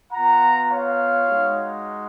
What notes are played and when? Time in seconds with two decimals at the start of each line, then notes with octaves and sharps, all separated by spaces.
0.12 B3 F4 F#5 A#5
0.69 C#5 F5
1.27 G#3 D#4 F#4